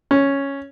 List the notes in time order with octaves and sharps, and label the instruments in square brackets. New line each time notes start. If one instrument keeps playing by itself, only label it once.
[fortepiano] C#4